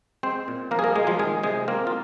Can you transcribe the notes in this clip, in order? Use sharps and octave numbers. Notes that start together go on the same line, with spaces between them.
G#3 C4 C5
A#2
F3 A#3 A#4
G#4
A#3 A#4
A#2 G#3 G#4
F3 F4
D#3 G#3 G#4
C3 G#3 G#4
A#3 C4 A#4
F4